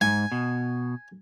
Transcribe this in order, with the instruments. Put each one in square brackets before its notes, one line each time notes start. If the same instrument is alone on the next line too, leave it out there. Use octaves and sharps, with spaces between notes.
[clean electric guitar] G#2 [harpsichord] G#5
[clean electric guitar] B2